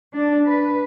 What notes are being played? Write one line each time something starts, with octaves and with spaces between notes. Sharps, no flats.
D4
B4